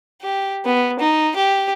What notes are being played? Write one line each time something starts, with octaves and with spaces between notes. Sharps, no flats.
G4
B3
D#4
G4